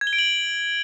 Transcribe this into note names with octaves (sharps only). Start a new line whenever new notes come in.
G#6
G7
D7
F#7